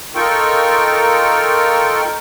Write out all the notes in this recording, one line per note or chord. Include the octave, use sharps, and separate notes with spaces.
D#4 F4 A4 A#4 G5 C#6